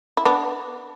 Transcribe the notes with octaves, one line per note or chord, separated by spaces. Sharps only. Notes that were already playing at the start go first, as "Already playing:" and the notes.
E4
B3 D4